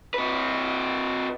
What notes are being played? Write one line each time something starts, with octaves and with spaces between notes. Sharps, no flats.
C3 B4